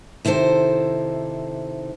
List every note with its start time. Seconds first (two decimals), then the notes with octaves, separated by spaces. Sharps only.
0.25 C3 D#3 E4 A4 C5